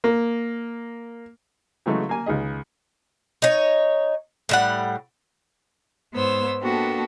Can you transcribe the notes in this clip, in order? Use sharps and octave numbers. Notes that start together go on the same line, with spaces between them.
A#3
C#3 E3 F#3 G#3 A3
A#3 G#5
C#2 D#3 G#4 D#5
D#4 C#5
A2 G3 F#5
G#2 B3 C5 C#5 E6
A#3 B3 D4 F#4 G4 A4